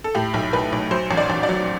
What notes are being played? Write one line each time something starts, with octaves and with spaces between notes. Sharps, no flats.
A4
A2 G4
B1
B1 B4
B1
F#3 C5
A1
D5
A1
D5
F#3